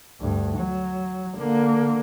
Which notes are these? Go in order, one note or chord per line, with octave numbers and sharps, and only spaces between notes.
D2 G2
F#3
D3 A#3